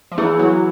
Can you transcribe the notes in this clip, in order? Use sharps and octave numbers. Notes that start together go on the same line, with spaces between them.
F3
E3 B3 E4 G#4
F#3